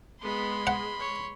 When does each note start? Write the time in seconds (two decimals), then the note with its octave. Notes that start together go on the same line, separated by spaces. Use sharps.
0.21 G#3 B3 B5 C6
0.67 F#5
1.00 C#5